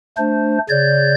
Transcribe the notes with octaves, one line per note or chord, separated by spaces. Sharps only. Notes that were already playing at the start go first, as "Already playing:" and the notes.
A3 D4 C5
C#3 C#5 D5 G6